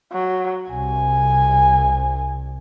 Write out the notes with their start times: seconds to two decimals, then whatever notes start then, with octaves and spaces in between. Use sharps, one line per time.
0.12 F#3
0.71 C2 C3 G#5